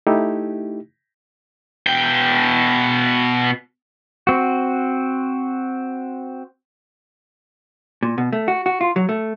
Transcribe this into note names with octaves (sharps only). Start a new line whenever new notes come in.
A3 D#4 E4 G4
B2 G5
C4 F#4
A#2
B2
A3
F#4
F#4
F4
F#3
A3